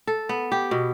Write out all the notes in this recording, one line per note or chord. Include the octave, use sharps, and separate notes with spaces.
A4
B3
G4
B2